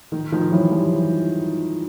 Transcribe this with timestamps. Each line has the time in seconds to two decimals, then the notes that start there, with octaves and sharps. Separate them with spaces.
0.12 D#3
0.32 D#3 F3
0.52 E3 F#3
0.71 F3 G3
0.90 E3 F#3